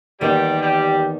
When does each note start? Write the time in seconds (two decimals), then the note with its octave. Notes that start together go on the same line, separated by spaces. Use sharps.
0.21 E2 D#3 G3 A#3 D#4 G4
0.61 G3 G4